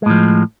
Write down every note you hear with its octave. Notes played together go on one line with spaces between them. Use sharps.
A2 F3 G#3